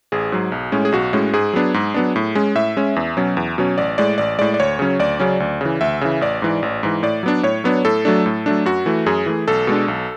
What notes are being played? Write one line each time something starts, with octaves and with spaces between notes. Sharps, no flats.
A1 G#4
G#2 F#3
B1
A2 G#3 C#4
G#4
B1 F#4
A2 G#3 C#4
G#2 G#4
F#3 B3 D4
G#2
F#3 B3 D4
A2
G#3 C#4
A2 E5
G#3 C#4
E2
B2 F#3 C#4
E2
B2 F#3 C#4
A1 D5
A2 G#3 D5
A1 D5
A2 G#3 D5
D5
D2 C#5
C#3 F#3 C#4
D2 D5
C#3 F#3 C#4
D2
C#3 E3
D2 E5
C#3 E3
A1 D5
G#2 E3
A1
G#2 E3
A2 D5
F#3 B3 D4
A2 C#5
F#3 B3 D4
A2 A4
F#3 A3 D4
A2
F#3 A3 D4
F#2 F#4
E3 A3
F#2 G#4
E3 A3
B1 A4
B2 G#3 D4
B1